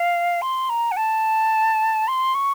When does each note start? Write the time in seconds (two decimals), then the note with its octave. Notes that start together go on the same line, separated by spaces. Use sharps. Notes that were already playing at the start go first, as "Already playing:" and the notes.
Already playing: F5
0.42 C6
0.70 A#5
0.92 F#5
0.97 A5
2.08 C6
2.35 C#6